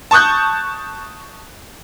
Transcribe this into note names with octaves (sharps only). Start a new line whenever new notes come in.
A5 C#6 D#6 F#6 G6